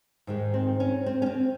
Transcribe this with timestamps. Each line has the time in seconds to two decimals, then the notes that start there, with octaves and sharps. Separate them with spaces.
0.27 G#2 D#3 G#3
0.54 C4
0.80 C#4
1.06 C4
1.22 C#4
1.26 C4